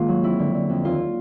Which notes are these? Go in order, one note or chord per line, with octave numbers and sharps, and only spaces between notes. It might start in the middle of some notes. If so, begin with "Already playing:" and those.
Already playing: G#2 D#3 A#3 F4
F#3
F2 E4
D3
D3
F2
D#2 F4